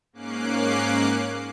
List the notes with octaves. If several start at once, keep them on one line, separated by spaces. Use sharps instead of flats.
G#2 A#3 C#4 D6 F#6 C7